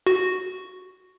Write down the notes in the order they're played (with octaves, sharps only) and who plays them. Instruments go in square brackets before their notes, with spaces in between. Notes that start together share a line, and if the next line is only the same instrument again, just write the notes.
[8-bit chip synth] F#4